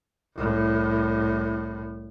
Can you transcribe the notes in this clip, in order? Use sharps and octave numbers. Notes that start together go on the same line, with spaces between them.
C2 A2